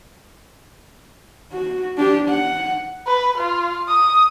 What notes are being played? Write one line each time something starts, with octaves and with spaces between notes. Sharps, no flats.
F#4
D4 G4
F#5
B4
F4
D#6